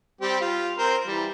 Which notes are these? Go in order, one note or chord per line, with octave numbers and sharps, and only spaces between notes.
G3 C4 G4
F4
C4 A#4 C5
E3 G3